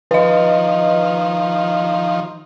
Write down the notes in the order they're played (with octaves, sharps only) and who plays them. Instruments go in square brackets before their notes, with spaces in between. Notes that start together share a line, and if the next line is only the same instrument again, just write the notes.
[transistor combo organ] D#3 F3 [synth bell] B4 D#5